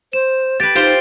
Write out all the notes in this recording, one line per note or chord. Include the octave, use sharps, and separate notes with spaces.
C5 E7
G4 B4 A6 D7
D#4 F4 G4 C5 D7 G7